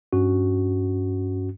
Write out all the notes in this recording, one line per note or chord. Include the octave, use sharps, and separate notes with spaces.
G2 C#4 F#4